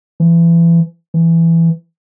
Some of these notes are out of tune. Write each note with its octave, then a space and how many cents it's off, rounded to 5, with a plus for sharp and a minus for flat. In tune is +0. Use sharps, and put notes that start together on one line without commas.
E3 +30
E3 +10